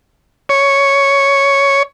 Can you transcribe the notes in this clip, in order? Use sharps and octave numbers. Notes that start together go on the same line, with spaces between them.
C#5